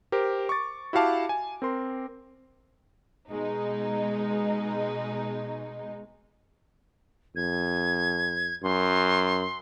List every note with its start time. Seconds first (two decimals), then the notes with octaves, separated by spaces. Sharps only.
0.12 G4 A#4 C5
0.49 C#6 D6 A6
0.93 E4 F#4 G4 F5 A5 D6
1.29 G#5
1.62 C4 A#4 C6
3.30 B2 G#3 D#4
7.36 F2 G#6
8.63 F#2 C6